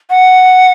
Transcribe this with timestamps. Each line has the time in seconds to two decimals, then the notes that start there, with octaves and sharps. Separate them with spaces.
0.10 F#5